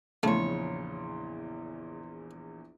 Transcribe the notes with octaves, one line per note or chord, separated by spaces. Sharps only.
A#1 E2 C#3 A3 C#5 C6